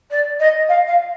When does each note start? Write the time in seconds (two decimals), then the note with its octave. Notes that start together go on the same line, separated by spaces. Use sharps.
0.10 D5
0.39 D#5
0.68 F5
0.87 F5